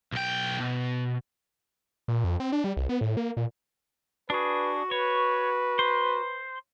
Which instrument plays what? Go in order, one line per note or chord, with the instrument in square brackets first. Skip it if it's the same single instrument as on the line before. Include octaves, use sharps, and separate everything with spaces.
[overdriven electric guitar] B1 G5
B2
[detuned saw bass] A#2
F2
C4
D4
G3
C2
B3
A2
A#3
A#2
[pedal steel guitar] D4 G#4 [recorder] F#4 [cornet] B4
[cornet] B4 [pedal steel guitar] C#5
[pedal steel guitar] C5